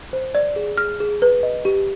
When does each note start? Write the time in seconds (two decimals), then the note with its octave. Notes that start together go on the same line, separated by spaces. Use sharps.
0.13 C5
0.35 D5
0.56 G#4
0.78 G#4 F6
1.00 G#4
1.22 B4
1.43 D#5
1.65 G4